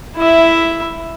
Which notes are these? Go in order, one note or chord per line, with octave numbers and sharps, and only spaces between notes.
E4 E5